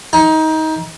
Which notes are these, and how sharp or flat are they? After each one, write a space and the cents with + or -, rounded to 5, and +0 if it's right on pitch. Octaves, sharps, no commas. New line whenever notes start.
D#4 +25